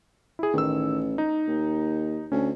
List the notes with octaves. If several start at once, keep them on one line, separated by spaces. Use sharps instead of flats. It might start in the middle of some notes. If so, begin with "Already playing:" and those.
E4 G#4
A1 D#3 E6
D#4
D#2
D2 C#4